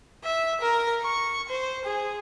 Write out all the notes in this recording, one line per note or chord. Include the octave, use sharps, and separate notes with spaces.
E5
A#4
C#6
C5
G#4